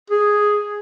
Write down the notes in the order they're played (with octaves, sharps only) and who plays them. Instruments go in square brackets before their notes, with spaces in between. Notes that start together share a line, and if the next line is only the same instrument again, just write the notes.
[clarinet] G#4